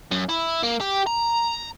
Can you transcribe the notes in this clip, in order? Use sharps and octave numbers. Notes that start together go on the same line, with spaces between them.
F#2
E4
A#3
G4
A#5